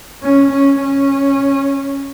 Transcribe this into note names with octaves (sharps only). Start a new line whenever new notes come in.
C#4
C#4
C#4